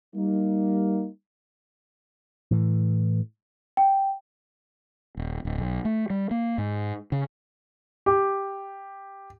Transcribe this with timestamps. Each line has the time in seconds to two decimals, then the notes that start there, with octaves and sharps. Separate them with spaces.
0.15 G3 A#3 D#4
2.51 A2 E3
3.77 G5
5.17 D#1
5.45 D1
5.59 B1
5.85 A3
6.10 G3
6.31 A#3
6.58 G#2
7.12 C#3
8.06 G4